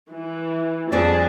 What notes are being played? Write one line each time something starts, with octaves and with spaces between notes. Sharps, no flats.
E3
F2 G3 C4 D4 G#4 D5 A5